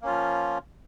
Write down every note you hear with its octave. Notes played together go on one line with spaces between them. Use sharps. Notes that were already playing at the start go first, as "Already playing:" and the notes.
F3 A#3 C#4 F4